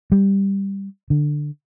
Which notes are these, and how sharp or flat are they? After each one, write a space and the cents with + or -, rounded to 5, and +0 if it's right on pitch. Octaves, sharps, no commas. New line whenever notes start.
G3 +5
D3 +10